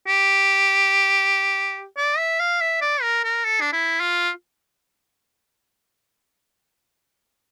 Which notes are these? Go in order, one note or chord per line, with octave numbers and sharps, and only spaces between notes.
G4
D5
E5
F5
E5
D5
A#4
A#4
A4
D4
E4
F4